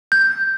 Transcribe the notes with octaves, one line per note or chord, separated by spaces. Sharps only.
G6